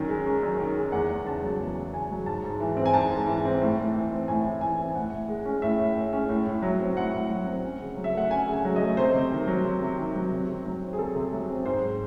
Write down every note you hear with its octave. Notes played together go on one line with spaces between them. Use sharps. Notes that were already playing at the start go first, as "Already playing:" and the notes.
Already playing: F#2 D#3 C#4
G#3
C#4
F#2
D#3
G#3
E2 F#5
E2
C#3 A5
F#3
E2
E2
C#3 G#5
F#3
G#2 A5
G#2
E3
C4
G#5
G#2 A5
G#2
E3
C4
A2
A2
E3
C4
A2 G#5
A2
E3 G#5
C4
G#5
A2 F#5
A2
G#3
C#4
A2 E5
A2
G#3
C#4
A2
A2
F#3
C4
A2 F#5
A2
F#3
C4
C#4
C#3
F#3
E5
A3 F#5
C#4 G#5
C#3
G#5
F#3
A3 D#5
C3 C5
C3
D#3
F#3
C3
C3
D#3
F#3
C3
C3
F#3
C4
G#4
C3 A4
C3
F#3
C4
G#2 C5